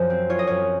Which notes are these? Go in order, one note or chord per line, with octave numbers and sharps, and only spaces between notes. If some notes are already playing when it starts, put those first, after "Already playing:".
Already playing: F#2 F3 C5
C4
F4 C#5
D#5
F#2 C#5